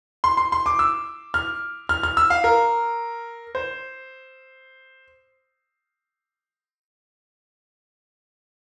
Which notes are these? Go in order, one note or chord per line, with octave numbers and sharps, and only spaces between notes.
C6
C6
C6
D6
E6
F6
F6
F6
E6
F5
A#4
C5